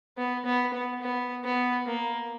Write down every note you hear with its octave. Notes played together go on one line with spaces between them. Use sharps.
B3
B3
B3
B3
B3
A#3